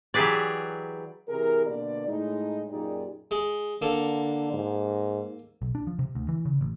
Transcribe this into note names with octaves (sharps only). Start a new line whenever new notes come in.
E3 F#3 G4 G#4 B4 D5
C3 E3 G#4 A#4
B2 D3 A#3 B3 D5
A2 G#3 D#4
F#2 A#2 D#4 G4 G#4 D5
G#3
D3 A#3 A4
G#2
B1
D4
F3
C3
D2
E3
C#3
A1